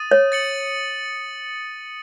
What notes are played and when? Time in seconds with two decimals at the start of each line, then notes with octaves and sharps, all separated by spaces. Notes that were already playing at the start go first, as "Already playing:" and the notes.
Already playing: D#6 A6 D#7
0.11 C#5
0.32 A6 C#7 F#7